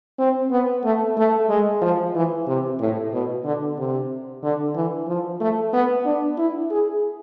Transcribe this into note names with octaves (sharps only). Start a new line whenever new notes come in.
C4
B3
A3
A3
G#3
F3
E3
C3
A2
B2
D3
C3
D3
E3
F3
A3
B3
D4
E4
G#4